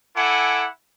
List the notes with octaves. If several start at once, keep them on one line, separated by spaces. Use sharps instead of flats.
E4 A4 F#5 G#5 D6